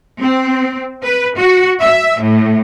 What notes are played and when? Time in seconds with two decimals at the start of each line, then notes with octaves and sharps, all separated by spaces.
0.20 C4
1.03 B4
1.36 F#4
1.81 E5
2.21 A2